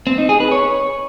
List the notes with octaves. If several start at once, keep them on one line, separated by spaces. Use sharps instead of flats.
C4
D#4
G#4
B4
C#5